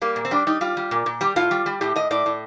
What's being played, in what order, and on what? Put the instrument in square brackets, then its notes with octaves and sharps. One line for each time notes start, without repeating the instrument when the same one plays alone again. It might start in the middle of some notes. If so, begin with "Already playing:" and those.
[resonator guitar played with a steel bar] G3 A#3
A#2
C4
G3 D4
G3 D#4
G3 F4
G3
A#2
A#2
G3 G4
A2 F4
G3
G3
A2 G4
A2 D#5
A2 D5
A2